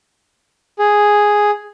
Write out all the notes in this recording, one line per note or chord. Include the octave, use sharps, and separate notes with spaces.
G#4